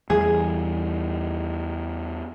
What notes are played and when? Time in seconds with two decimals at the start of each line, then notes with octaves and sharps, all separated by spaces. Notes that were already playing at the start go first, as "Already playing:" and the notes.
0.10 E2 E3 G3 G#4